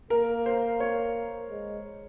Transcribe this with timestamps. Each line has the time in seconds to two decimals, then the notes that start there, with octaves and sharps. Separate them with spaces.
0.10 A#3 A#4
0.46 C5
0.80 C#5
1.50 G#3